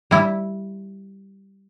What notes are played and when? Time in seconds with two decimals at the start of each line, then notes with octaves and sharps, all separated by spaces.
0.11 G3 E4